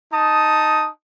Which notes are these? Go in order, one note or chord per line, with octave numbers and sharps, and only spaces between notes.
D#4 A5 D#6